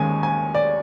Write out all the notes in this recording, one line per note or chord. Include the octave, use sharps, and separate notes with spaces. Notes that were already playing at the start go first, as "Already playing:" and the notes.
Already playing: D#2 D#3 G#3 C#4 G#5
G#5
D5